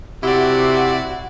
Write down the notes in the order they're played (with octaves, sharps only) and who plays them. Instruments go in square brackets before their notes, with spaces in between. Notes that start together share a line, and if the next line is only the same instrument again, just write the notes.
[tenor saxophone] C3 [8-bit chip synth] E4 D5 [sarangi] F#4